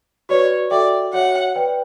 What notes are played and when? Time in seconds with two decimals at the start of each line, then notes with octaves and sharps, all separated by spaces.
0.29 F#4 B4 C#5 D5
0.71 F#4 A4 D5 E5 G5
1.13 F#4 C#5 E5 F#5
1.55 B4 D5 G5